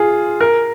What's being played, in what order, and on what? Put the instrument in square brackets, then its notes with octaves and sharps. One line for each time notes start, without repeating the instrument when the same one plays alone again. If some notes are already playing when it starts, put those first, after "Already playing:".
Already playing: [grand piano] F4 G#4
A#4